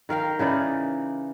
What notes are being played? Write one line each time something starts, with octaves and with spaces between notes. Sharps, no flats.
D#3 A#4 F5 G5
C#3 E3 D#4 D5